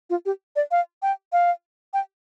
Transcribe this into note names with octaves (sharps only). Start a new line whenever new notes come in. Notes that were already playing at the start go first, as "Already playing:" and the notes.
F4
G4
D5
F5
G5
F5
G5